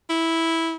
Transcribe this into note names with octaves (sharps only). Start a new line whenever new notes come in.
E4